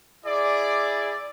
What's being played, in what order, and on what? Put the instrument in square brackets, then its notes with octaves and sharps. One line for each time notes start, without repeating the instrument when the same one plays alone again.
[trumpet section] E4 G#4 D5